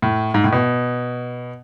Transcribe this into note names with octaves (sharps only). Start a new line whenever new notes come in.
A2
G#2
A2
B2